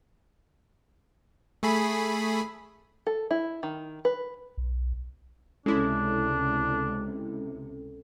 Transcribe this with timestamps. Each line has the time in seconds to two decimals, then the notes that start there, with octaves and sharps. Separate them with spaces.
1.63 A3 G#4 B5
3.07 A4
3.31 E4
3.63 D#3
4.05 B4
4.57 B1
5.66 C#2 C3 G#3 C#4 D4 E4 A4